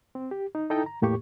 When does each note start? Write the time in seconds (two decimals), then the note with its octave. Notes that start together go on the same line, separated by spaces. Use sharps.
0.15 C4
0.31 G4
0.55 D#4
0.70 D#4 E4 A4 D#5 G5 A#5
0.86 A#5
1.02 E2 A2 A#3 G4 C#6